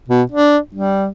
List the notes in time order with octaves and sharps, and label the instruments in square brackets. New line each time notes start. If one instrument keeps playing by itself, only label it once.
[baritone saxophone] B2
D4
G3